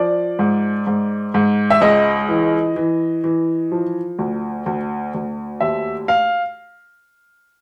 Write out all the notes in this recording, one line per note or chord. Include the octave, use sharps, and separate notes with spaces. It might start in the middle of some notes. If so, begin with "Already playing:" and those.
Already playing: F3 D5
G#2
G#2
G#2
E5
C#2 D#5
E3
E3
E3
F3
D2
D2
D2
D#2 E5
F5